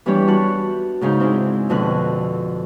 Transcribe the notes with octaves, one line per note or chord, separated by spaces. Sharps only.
E3 G3 B3 D4 G4 C#5
F#4 A5 C#6 F#6
G#2 C#3 C#4 D#4 G6
C4 D4 E4 G#4
F2 B2 D3 C#4 F#6